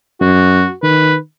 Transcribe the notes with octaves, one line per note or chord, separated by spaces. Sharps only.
F#2 F#4
D#3 B4